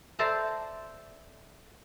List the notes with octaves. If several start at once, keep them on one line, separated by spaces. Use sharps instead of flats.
A4 C5 D5 E5 A5 A#5